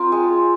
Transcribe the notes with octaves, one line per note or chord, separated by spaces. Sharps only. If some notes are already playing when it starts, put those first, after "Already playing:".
Already playing: C4 F4 A#4
G#3